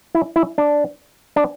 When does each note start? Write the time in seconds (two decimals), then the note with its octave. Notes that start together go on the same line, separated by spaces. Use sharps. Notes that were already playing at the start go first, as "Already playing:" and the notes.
0.15 E4
0.36 E4
0.58 D4
1.36 D4